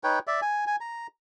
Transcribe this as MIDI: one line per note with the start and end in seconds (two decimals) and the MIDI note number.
0.04 0.19 63
0.04 0.19 71
0.04 0.19 73
0.04 0.19 79
0.27 0.40 74
0.27 0.40 76
0.42 0.65 80
0.67 0.76 80
0.81 1.07 82